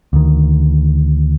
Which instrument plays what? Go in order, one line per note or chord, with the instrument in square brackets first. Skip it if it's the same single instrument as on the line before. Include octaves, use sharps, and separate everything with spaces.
[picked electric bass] D2 D#3